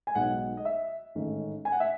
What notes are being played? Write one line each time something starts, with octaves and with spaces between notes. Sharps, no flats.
G#5
B1 B2 G#3 D#4 F#5
D#5
E5
A1 G#2 D#3 A3 C#4
G#5
F#5
E5